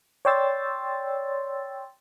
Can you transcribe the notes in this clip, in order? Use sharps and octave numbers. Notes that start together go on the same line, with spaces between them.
C#5 D5 G5 C6 E6 A6